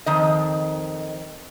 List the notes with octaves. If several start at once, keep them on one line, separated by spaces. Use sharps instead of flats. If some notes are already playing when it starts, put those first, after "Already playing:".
F2 D#3 D#5